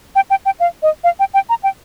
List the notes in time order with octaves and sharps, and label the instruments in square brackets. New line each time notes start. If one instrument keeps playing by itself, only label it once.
[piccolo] G5
G5
G5
F5
D#5
F5
G5
G5
A#5
G5